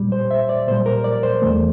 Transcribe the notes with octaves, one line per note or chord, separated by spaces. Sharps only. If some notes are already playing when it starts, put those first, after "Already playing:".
Already playing: A#2 G3
C5
E5
D5
A#2 G3 C5
A#4
D5
C5
E2 E3 A3